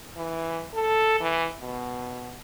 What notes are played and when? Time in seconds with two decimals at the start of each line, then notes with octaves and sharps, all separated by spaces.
0.16 E3
0.74 A4
1.20 E3
1.60 B2